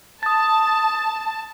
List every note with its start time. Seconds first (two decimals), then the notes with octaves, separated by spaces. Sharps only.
0.23 A5 D#6 A6